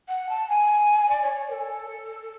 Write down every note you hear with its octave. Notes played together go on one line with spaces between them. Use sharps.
F#5
A5
G#5
D5
C#5
C#5
A#4
A4